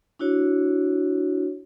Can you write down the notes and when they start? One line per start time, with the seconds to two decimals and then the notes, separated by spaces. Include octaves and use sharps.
0.19 D4 E4 F#4 C#5